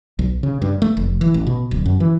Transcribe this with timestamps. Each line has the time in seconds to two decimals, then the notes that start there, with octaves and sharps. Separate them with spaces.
0.19 B1
0.43 C#3
0.62 G2
0.82 A3
0.97 F1
1.21 E3
1.34 A1
1.47 B2
1.71 D1
1.86 F#2
2.00 E3